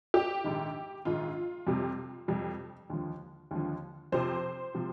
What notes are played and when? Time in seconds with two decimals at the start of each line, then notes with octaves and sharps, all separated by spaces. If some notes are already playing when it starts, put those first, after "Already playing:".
0.14 G4
0.44 A#1 G#2 D#3
1.05 A#1 G#2 D#3 F4
1.67 F2 C3 G3
2.28 F2 C3 G3
2.90 D#2 D3 F3
3.51 D#2 D3 F3
4.12 F2 C3 F3 C5
4.75 C3 F3